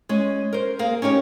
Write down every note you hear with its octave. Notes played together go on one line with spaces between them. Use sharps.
G#3 C#4
A#4 C5
A#3 G#4 A#4 F5
C#4 D#4 G4 C#5